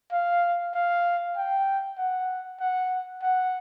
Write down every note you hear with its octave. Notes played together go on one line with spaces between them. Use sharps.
F5
F5
G5
F#5
F#5
F#5